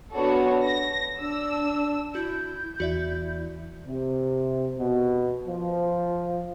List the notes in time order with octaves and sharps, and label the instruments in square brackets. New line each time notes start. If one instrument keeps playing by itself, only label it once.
[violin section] B3 D4 F#4 A4 C#5
A#6
D4 E6
[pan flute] E4 [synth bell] F#4 [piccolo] G6
[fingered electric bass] E2 [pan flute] E4 [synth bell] F#4 D5 E5
[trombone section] C3
B2
F3